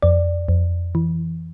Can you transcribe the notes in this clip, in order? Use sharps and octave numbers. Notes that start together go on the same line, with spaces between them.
F2 D5
F2
E3